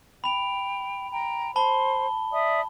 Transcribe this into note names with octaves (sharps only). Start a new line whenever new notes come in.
G5 B5 F7
G5 A#5
C5 A5 B5 G7
D5 E5 D#6